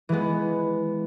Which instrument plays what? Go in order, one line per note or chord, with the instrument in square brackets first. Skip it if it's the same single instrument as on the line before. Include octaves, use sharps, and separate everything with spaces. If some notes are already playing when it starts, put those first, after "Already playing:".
[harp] E3 G#3 B3